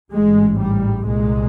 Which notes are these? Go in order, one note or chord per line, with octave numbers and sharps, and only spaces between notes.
A1 G#2 G#3
G3
C2 A#2 G#3